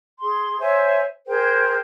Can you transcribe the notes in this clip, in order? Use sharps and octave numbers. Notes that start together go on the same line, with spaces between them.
G#4 C6
C5 C#5 E5 G#5
G#4 A#4 C5 G5